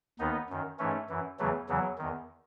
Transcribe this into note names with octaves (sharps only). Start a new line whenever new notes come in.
D#2 D#3 B3 D#4
F#2 D#3
G#2 E3 A3 C#4
F#2 E3
E2 C#3 E3 F#3 A3
E2 C#3 E3 F#3
E2 D#3